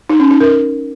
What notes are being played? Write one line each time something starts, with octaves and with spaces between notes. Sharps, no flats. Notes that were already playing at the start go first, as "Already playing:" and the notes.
D#4
C#4
D#4
A#4